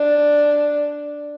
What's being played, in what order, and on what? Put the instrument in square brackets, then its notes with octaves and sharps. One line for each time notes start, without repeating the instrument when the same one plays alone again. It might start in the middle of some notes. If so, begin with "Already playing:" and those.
Already playing: [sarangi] D4